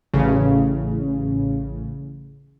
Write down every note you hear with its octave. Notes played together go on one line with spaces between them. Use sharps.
A1 C#3